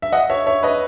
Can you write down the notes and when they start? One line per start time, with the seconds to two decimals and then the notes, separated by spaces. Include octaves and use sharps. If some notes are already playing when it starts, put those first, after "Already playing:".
0.02 E5
0.12 D#5 F#5
0.30 C#5 E5
0.47 C#5 E5
0.63 B4 D#5